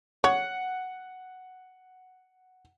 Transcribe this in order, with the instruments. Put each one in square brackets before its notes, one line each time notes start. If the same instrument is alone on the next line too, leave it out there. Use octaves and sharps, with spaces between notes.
[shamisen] C#5 [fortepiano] F#5